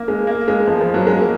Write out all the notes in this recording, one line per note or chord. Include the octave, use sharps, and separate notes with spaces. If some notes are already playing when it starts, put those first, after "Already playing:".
Already playing: A#3
G#3
A#3
G#3
F3
F3
F#3
G#3
A#3